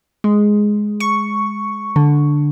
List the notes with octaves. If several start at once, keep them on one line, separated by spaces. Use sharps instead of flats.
G#3
C#6
D3